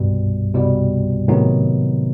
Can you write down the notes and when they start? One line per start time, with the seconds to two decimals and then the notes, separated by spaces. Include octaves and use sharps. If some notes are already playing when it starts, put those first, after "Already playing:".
Already playing: C2 G2 B2 G3
0.54 C2 B2 G3
1.28 A2 C3 D#3 F#3 B3 D#4